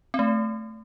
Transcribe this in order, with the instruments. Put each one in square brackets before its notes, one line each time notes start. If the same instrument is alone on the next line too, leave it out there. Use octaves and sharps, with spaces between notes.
[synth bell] C4
A3